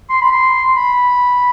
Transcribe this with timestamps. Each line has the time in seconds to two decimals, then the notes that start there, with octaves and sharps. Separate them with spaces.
0.10 C6
0.21 B5
0.32 C6
0.76 B5